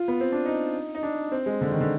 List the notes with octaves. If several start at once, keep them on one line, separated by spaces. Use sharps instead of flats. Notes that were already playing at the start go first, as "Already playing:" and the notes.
Already playing: F4
B3
C4
D4
D#4
D#4
D4
C4
G#3
D3
D#3
D3